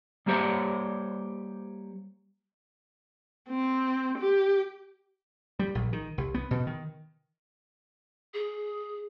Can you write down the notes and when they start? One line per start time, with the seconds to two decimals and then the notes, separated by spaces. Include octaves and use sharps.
0.26 G3 A#3 G4 C5 C#5
3.49 C4
4.18 G4
5.59 G3
5.75 A#1
5.93 D#3
6.18 C2
6.34 B3
6.51 B2
6.67 D#3
8.34 G#4